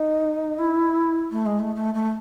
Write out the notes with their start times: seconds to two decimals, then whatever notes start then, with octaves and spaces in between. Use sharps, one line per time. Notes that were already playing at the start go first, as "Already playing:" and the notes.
Already playing: D#4
0.59 E4
1.31 A3
1.46 G#3
1.60 A3
1.75 A3
1.94 A3